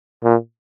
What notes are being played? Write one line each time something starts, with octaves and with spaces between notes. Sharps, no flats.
A#2